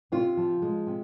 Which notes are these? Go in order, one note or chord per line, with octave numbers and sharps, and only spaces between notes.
C3 F4
F3
G#3
C3